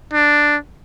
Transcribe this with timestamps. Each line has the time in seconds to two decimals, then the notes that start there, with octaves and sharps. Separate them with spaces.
0.14 D4